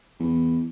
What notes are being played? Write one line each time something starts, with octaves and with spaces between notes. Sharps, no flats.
E2